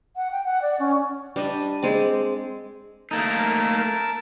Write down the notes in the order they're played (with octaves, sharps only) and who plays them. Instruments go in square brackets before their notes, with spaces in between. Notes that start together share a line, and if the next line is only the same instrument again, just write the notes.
[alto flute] F#5
G5
F#5
D5
C#4
[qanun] G3 D4 D#5
G#3 C4 D5
[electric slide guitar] A3 A#3 D#4 [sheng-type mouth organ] A#4 A5 E6